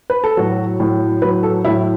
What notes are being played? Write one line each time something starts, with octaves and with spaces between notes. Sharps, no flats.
B4
A4
A2 F#3 F#4
A2 F#3
A2 F#3 B4
A4
A2 F#3 E4